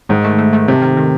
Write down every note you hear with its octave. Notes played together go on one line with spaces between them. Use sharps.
G#2 D#3
A3
A3
A3
C3 A3
D#3
D#3